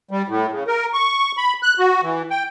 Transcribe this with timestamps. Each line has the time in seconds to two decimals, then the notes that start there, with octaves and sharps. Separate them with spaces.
0.11 G3
0.28 A2
0.52 C#3
0.67 A#4
0.93 C#6
1.37 B5
1.63 F#6
1.79 F#4
2.03 E3
2.30 G5